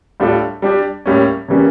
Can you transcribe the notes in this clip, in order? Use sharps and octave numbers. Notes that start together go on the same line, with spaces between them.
A2 G3 D4 F4 A4
G3 D4 G4
A2 G3 A#3 C#4
C#3 E3 G3 A#3 C#4